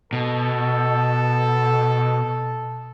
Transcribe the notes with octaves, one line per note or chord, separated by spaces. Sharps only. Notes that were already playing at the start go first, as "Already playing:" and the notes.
B2 A4